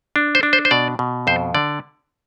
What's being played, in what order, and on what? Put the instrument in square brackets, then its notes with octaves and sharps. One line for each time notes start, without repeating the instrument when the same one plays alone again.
[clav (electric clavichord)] D4
C5
D4
C5
C5
B2 D5
B2
F2 C5
D3 D5